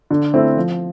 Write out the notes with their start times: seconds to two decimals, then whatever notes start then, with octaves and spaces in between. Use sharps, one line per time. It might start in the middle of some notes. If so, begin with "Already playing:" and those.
0.10 D3
0.34 A3 C4 E4
0.57 F3